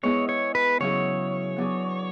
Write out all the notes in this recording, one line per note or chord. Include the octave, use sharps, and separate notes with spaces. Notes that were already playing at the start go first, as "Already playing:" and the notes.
G#3 B3 E4 G#4 C#5
C#5
B4
C#3 F#3 C#4 E4 G#4 C#5
F#3 B3 D4 G#4